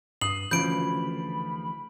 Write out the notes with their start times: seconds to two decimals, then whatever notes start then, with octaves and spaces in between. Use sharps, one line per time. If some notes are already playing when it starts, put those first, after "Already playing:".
0.21 G2 D#6 C7 F#7
0.51 D2 C#3 E3 F3 B5 G6 D7